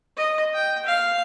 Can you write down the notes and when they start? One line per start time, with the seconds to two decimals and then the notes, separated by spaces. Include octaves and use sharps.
0.17 D#5
0.54 G5
0.85 F5